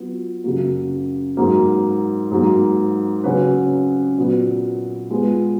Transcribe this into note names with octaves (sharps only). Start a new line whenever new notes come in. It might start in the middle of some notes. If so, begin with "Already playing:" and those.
Already playing: F#3 B3 F4
F#2 C#3 F#3 A#3
G#2 F#3 A#3
G#2 F#3 A#3
C#3 F#3 C#4 F#4 B4
A#2 F#3 B3 F#4 B4
G#3 B3 F4 G#4 B4